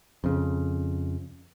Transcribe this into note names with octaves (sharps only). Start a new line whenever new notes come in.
F2 C#3